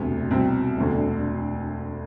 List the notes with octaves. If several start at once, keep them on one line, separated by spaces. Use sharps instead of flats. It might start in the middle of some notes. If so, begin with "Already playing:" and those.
Already playing: E1 D2 C3 B3
C2 B2 C4
E1 D2 D3